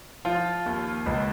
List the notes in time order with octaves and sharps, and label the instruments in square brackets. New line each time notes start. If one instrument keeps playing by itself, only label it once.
[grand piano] F3 F4
D#2
C#2